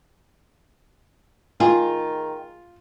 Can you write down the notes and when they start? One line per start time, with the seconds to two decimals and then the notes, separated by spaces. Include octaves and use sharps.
1.60 D#3 F4 G#4